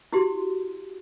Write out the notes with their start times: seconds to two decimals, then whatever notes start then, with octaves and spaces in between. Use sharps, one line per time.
0.13 E4 F#4 G4 C6